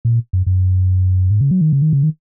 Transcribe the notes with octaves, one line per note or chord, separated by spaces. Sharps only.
A#2
F#2
F#2
G#2
C#3
F#3
D#3
C#3
D#3
C#3
D#3